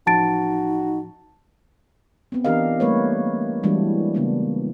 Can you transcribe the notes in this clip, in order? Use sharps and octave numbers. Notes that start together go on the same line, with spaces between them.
A1 F3 D#4 F#4 A5 A6 D7
B3 C4
E3 D4 G4 A#4 D#5 F5
G3 A3 A#3 B4 C#5
E3 G3 G#3 D4 E4 F#4
C#3 A#3 B3 D4